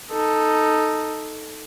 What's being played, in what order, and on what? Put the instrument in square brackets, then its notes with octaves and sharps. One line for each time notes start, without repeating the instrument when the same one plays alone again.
[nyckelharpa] D#4 A4